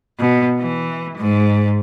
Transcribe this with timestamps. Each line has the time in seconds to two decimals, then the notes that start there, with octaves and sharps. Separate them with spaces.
0.19 B2
0.60 E3
1.17 G#2